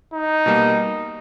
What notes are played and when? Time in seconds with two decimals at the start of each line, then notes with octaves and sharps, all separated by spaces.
0.14 D#4
0.46 B2 G3 A#3